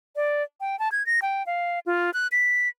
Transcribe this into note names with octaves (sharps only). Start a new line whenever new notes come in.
D5
G5
A5
G#6
A#6
G5
F5
F4
F#6
B6